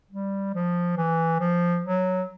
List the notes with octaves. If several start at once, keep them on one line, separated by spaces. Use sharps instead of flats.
G3
F3
E3
F3
F#3